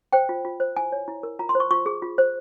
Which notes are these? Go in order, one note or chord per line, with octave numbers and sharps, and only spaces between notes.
C5 G5
F4
F4
C5
E4 G#5
C#5
E4
A#4
F4 A#5
C6
C5
C#6
F4 C#6
G#4
F4
C5